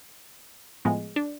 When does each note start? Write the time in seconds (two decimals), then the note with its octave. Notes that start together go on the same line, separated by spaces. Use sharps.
0.85 A2 F3 G#3 B3
1.16 D4